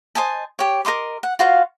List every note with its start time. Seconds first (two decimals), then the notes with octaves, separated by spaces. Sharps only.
0.15 C5 D#5 G#5 A5
0.59 G4 C#5
0.85 A#4 D#5 C6 D6
1.23 F#5
1.39 F4 F#4 C5 F5